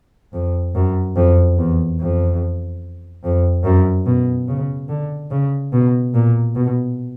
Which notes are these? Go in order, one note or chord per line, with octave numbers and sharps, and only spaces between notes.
F2
F#2
F2
E2
F2
F2
F#2
B2
C#3
D3
C#3
B2
A#2
B2